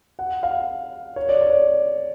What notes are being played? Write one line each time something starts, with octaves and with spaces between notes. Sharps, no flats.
F#5
F5
C#5
D5
C#5
D5